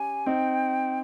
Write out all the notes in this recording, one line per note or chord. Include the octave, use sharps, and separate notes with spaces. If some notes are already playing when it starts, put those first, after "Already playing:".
Already playing: C#4 G4 G#5
C4 D#4 G5